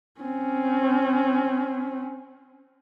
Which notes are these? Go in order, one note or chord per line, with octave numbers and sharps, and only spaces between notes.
C4 C#4